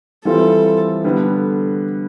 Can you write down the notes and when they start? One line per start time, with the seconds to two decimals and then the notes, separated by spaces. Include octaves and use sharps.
0.25 E3 G3 C4 F4 A4
1.04 D3 G3 B3